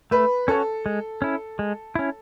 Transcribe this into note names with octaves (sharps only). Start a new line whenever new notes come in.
A3 B4
C#4 F#4 A4 C#5
G#3
C#4 E4
G#3
C#4 E4